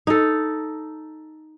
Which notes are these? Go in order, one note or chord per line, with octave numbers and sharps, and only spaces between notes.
D#4 A4